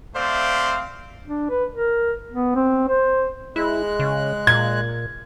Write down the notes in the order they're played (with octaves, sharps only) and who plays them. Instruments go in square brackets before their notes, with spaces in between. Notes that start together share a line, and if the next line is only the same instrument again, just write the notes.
[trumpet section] A3 C4 C5 D5 E5 F5
[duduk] D4
B4
A#4
B3
C4
C5
[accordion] G#3 F#6 [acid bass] E4
[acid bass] C#3
[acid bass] A#2 [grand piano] G#6